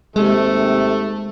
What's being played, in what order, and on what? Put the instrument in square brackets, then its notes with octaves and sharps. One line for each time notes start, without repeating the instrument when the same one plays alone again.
[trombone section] D#2 C3 [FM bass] G#3 [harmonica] A3